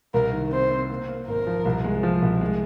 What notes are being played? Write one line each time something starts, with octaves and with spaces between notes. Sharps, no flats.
C2 A#4
D#3
C4 C5
C4
A#3
A#3
G#1 A#4
F3
C2
G#3
F3
C2
G#3